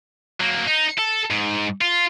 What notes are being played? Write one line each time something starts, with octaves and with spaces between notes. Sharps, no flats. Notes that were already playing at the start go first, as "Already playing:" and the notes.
F#3 A#3
D#4
A4
G#2
F4